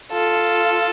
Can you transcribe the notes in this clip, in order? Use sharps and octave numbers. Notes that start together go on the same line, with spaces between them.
F4 A4